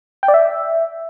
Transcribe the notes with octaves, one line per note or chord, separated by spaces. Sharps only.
G5
D5
E5